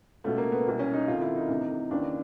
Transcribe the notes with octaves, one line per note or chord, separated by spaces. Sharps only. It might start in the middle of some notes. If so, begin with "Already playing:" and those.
C#2 B2 A3
A#3
B3
C2 B2
C#4
D#4
F2 C3 D#3 F4
E4
D#4
D2 C3 E3
D#2 C#3 E3 D4